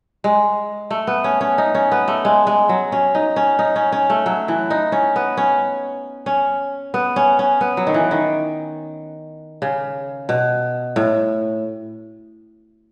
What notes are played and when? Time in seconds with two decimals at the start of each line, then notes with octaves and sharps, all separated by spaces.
0.24 G#3
0.91 A3
1.07 B3
1.24 C#4
1.41 C#4
1.58 D#4
1.75 C#4
1.92 B3
2.08 A3
2.25 G#3
2.47 G#3
2.69 F#3
2.92 C#4
3.15 D#4
3.36 C#4
3.59 D#4
3.76 C#4
3.92 C#4
4.10 A3
4.26 F#3
4.48 E3
4.70 D#4
4.92 C#4
5.16 B3
5.37 C#4
6.26 C#4
6.94 B3
7.16 C#4
7.39 C#4
7.61 B3
7.77 F#3
7.87 D#3
7.94 E3
8.11 D#3
9.62 C#3
10.29 B2
10.96 A2